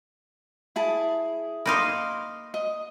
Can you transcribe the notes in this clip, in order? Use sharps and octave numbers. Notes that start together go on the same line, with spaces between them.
E4 G#4 A5
A#3 D#4 F5 B5 C6
D#5